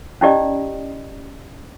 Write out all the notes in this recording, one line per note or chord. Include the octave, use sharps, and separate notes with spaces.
C#4 D#4 E4 G4 D5 D#5